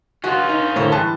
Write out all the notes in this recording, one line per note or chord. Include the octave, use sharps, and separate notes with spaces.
F3 G#3 C#4 F4 F#4
D#4
A2 D3 A#4 C5 C#5
E3 G3 G#3 A5